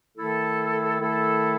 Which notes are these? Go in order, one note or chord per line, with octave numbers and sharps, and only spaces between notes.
D#3 A3 E4 A4
D#3 A3 E4 A4